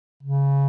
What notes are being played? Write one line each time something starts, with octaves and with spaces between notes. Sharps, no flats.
C#3